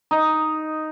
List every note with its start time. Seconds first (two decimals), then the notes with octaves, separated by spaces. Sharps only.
0.11 D#4